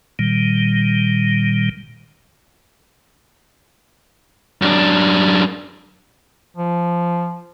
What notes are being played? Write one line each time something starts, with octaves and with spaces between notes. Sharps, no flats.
A#2 D#3 G3
F#2 D4
F3